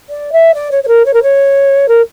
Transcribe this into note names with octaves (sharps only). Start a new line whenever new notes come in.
D5
E5
D5
C#5
C#5
A#4
C#5
A#4
C#5
A#4